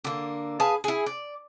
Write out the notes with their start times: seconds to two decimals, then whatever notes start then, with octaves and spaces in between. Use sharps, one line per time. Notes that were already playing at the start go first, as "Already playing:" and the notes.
0.04 D3 A#3
0.60 G#4 B4 F5 A5
0.84 E4 G#4
1.06 D5